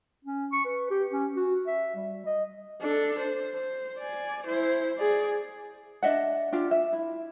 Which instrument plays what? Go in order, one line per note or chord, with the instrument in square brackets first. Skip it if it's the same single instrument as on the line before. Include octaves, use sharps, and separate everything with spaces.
[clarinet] C#4
C#6
B4
G4
C#4
F#4
E5
G3
D#5
[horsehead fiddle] D4 A4
C5
C5
D5 G#5
E4 C5
G#4 D5
[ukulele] D4 D#5 E5 F#5
D4 F4 G4
E5
E4